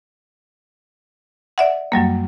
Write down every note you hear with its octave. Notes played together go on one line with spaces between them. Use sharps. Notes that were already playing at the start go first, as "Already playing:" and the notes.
D5 E5 F#5
F#2 F#3 G3 A#3